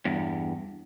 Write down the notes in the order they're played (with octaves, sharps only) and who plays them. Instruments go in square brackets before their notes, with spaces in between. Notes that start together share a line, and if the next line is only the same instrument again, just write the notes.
[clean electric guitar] E2 G2